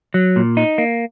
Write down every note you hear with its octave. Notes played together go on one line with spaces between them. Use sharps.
F#3
A#2
D#4
A#3